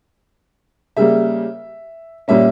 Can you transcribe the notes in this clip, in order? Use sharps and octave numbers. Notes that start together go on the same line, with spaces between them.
C#3 G3 A#3 E5
A#2 G3 A#3 C#4 E5